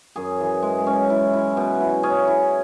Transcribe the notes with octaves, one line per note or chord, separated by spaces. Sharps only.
F#2 G#4
E3
G#3
C#4
E4
E4
B2
E4
C#4 G#4
E4